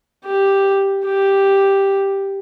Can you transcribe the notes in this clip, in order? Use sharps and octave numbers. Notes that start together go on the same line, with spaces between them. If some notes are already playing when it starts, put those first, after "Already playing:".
G4
G4